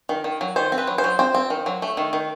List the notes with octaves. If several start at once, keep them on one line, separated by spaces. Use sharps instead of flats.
D#3
D#3
F#3
D#3 C5
C4
B4
F#3
C5
F#3
C4 C5
C4
D#3
F#3
A3
D#3
D#3